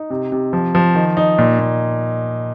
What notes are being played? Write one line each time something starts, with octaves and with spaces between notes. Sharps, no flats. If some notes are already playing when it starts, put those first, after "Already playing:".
Already playing: D#4
C3
C3
F3
F3
D#3
D#4
A#2
A#2